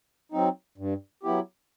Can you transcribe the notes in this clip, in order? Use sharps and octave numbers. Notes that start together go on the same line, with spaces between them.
F#3 C4 D#4
G2
F#3 B3 E4 G4